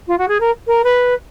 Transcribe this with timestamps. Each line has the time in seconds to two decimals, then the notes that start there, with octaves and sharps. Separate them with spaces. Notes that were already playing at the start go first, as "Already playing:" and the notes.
0.08 F4
0.18 F#4
0.28 G#4
0.40 A#4
0.67 A#4
0.84 B4